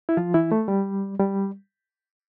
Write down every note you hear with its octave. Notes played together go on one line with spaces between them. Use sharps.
E4
F3 F4
E3 E4
A3
G3
G3